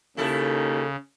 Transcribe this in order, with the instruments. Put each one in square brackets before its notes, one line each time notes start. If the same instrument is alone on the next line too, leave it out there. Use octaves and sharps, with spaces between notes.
[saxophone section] D#2 [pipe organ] C#3 [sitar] E4 A4